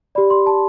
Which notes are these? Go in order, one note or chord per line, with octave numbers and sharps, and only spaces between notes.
G4 D5 B5
C6
A5